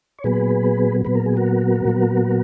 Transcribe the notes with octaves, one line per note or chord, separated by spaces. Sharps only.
C#5
A#2 F#3 B3 G#4 B4
A#2 F#3 B3 B4
A#4
G#4
F#4 A#4
A#2 F#3 B3